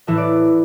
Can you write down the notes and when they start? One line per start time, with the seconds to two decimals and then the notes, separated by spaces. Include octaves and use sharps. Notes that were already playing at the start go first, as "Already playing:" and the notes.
0.07 A2 E3 E4
0.18 D5